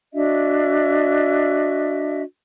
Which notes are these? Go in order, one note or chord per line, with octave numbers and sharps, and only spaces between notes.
D4 F#4 D#5 E5